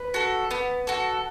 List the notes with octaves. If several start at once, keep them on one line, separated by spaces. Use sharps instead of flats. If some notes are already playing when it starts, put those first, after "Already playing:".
Already playing: B4
F#4 A4
B3
F#4 A4